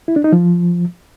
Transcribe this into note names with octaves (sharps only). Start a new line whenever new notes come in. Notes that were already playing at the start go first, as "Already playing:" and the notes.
E4
D4
D#4
F3